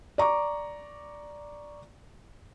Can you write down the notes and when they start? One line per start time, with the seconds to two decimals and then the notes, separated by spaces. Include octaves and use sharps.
0.18 D5 A#5 C#6 D6